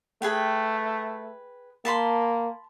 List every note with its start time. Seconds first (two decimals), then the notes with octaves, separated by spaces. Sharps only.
0.22 A3 G#4 B4 G5
1.85 A#3 A5 B5 C6